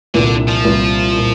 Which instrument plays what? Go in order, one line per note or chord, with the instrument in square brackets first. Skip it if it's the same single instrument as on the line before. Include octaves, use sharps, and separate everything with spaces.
[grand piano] C2 A#2 G3 [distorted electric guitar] D3
[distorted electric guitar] F3
[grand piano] C2 A#2 G3
A#2